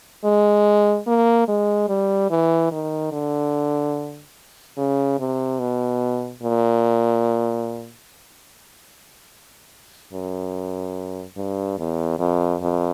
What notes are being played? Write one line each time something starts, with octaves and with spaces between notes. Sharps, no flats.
G#3
A#3
G#3
G3
E3
D#3
D3
C#3
C3
B2
A#2
F#2
G2
E2
F2
F2